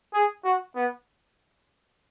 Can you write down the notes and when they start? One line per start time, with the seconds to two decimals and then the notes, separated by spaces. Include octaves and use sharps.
0.14 G#4
0.44 F#4
0.76 B3